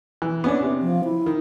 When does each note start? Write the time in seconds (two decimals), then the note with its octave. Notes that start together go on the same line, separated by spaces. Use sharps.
0.22 E3
0.44 B3 C#4 D4
0.62 C3
0.81 F3
1.04 E4
1.26 D#3